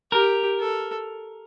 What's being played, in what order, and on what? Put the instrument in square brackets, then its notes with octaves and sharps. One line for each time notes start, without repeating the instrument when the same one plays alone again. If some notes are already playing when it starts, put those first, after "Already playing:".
[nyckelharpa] G4 [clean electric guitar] A#4
[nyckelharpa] A4